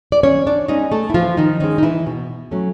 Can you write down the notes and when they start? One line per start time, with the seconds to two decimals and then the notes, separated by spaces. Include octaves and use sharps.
0.12 D5
0.23 E3 C#4 C#5
0.47 D4 D5
0.68 G#3 C#4 D#4 D#5
0.91 A3 A4
1.10 E4
1.14 E3 F3 F4
1.37 D#3 D#4
1.60 D#3 G#3 C#4 D#4
1.78 D#4
1.83 E3 E4
2.07 B2
2.51 F#3 A3 C#4